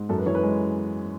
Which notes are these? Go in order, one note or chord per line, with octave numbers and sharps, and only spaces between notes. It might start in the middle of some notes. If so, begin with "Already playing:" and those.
Already playing: G#2
F#2 A4
B4
E3 C#5
B4
G#3